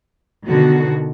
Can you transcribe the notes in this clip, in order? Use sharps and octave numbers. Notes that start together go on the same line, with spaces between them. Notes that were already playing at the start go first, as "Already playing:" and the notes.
B2 D3 D#3 F#4